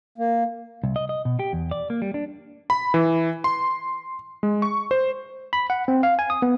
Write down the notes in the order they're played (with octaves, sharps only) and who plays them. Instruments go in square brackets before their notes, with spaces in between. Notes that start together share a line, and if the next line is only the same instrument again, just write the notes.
[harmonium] A#3
[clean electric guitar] C2
D#5
D#5
B2
G4
E2
D5
A#3
G3
D4
[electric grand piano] B5
E3
C6
G#3
C#6
C5
[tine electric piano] B5
F#5
C4
F5
G#5
D#6
B3